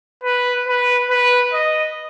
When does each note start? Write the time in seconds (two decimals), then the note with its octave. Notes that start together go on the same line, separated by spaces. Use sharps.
0.23 B4
0.67 B4
1.10 B4
1.54 D#5